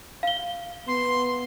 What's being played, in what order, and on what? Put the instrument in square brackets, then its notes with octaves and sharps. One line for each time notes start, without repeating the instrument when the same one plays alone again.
[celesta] F5 G7
[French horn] B3 [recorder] C6